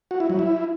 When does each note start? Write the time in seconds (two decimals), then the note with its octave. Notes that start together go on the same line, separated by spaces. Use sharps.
0.11 F#4
0.20 E4
0.30 F#3
0.39 E4